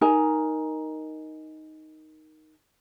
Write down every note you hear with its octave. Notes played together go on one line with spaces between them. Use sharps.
D#4 A#4 G#5 A#5